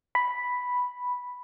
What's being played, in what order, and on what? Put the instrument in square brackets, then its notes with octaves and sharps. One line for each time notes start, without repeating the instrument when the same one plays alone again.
[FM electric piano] B5